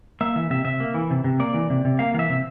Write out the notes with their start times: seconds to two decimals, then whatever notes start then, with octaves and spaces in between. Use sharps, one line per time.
0.21 A#3 E5
0.36 E3 E5
0.50 C3 E5
0.65 C3 E5
0.80 A#3
0.94 E3
1.11 C3
1.24 C3
1.40 A#3 D5
1.54 E3
1.70 C3
1.85 C3
1.99 A#3 F5
2.14 E3 F5
2.19 E5
2.30 C3